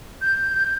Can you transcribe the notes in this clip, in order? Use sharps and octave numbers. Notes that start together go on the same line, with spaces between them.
G6